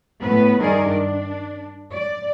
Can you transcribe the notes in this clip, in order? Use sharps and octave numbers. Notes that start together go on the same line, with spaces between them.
A2 B3 B4
G2 D#3 G#4 A#4 D5
D4
D5